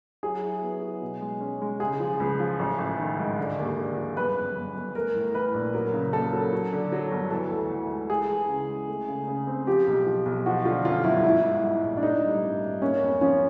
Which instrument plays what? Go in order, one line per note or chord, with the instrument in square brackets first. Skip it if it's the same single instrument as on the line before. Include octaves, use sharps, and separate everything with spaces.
[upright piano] F#3 [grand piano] G#4
[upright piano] E4
B3
F#3
B2
G#3
C#4
G#3
[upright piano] C#3 [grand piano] G#4
[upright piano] F3
C#2
F3
A1
A1
D#3
G#2
D3
D#2
D3
F3
[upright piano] G1 [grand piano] B4
[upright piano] F#2
G1
G1
[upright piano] A3 [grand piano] A#4
[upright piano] A2
[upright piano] E3 [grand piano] B4
[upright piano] A#1
[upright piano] F#3 [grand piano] A#4
[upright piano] C#3
[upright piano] A#3 [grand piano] A4
[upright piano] F#3
F#3
D3
F#3
G1
[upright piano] E3 [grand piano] A4
[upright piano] D2
D2
G#3
[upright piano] G#3 [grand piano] G#4
[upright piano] E3
C#3
G#3
A3
C#3
C#3
C4
[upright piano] F3 [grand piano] G4
[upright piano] B1
F3
B1
[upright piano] F3 [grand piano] F#4
[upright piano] D3 [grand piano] F4
[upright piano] F#2 [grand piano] F4
[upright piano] G1 [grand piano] E4
[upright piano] G#2 [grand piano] E4
[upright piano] G#2
G#2
A#1
[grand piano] D4
[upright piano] A3 [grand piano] D#4
[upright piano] G2
G#1
G#1
[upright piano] A#3 [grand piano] C#4
[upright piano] F2
[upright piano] F3 [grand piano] C#4